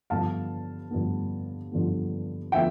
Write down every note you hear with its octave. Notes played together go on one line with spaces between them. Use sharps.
G2 D3 F3 B3 F5 A5
G2 D3 F3 B3
G2 D3 F3 B3
D3 F3 B3 E5 G5